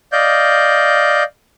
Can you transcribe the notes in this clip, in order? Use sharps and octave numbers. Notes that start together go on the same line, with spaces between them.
D5 D#5 F5 G6